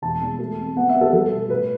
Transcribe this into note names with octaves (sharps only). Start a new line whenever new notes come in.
E1 A5
E2
A3
C4
B3 F#5
E5
B3
A4
G3 A4
B2
A2 B4